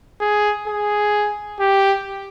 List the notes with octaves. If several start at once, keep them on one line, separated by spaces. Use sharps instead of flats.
G#4
G#4
G4